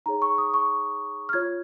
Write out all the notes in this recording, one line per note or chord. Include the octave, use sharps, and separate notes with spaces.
D#4 G#4 C#5 A#5
C#6
D#6
C#6
F6
F4 C#5 G#6